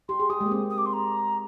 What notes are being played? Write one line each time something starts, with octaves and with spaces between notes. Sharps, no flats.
G4 C6
G#4
G4 D#6
G#3
A#3
C4
D#6
D6
C6
A#5